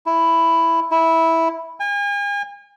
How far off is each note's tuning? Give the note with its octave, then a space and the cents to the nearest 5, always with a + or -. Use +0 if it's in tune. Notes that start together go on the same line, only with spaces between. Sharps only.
E4 +5
E4 -10
G#5 -40